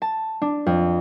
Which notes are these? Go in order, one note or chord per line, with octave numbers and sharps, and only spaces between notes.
A5
D4
F2